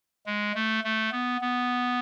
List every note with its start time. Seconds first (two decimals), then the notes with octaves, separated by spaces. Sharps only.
0.26 G#3
0.55 A3
0.84 A3
1.12 B3
1.41 B3